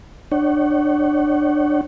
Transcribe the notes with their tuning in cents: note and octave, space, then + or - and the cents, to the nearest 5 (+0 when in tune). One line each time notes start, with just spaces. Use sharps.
D4 +20 C#5 +0 F#5 +40